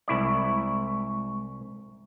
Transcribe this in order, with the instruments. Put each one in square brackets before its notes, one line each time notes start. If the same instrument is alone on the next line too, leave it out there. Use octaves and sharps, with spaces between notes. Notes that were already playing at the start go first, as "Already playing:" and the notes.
[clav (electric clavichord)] C2 E4 D5 [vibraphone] G#3 C#6